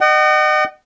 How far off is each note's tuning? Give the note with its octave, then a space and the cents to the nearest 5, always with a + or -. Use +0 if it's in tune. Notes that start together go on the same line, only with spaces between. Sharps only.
D#5 -30 F#5 +40